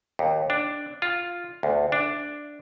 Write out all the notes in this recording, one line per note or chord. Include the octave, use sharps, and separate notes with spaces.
D#2
D4
F4
D2
D4